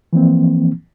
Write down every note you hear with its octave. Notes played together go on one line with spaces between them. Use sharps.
E3 F3 A#3 C4